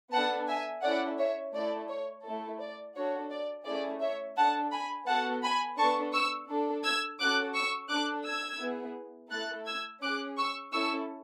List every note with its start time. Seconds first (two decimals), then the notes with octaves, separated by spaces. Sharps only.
0.12 B3 D4 A4 F#5 A5
0.48 E5 G#5
0.82 C#4 E4 A4 D5 F#5
1.18 C#5 E5
1.54 A3 E4 A4 D5
1.88 C#5
2.24 A3 E4 A4
2.60 D5
2.95 D4 F#4 A4 C#5
3.31 D5
3.66 A3 C#4 E4 G#4 D5
4.01 C#5 E5
4.36 D4 A4 F#5 A5
4.71 G#5 B5
5.07 B3 F#4 A4 F#5 A5
5.42 G#5 B5
5.77 B3 D4 A4 A5 C#6
6.13 C#6 E6
6.49 D4 A4
6.83 E6 G#6
7.19 C#4 F#4 A4 D6 F#6
7.54 C#6 E6
7.89 D4 A4 D6 F#6
8.25 E6 G#6
8.60 B3 E4 G#4
9.31 A3 E4 A4 F#6 A6
9.67 E6 G#6
10.01 C#4 G#4 D6 F#6
10.37 C#6 E6
10.72 C#4 E4 A4 C#6 E6